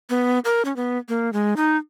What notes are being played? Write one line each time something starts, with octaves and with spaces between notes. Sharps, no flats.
B3
A#4
C#4
B3
A#3
G#3
D#4